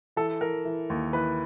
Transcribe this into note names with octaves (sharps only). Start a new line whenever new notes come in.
E3 A4
E3 A#4
E3
D#2
E3 B4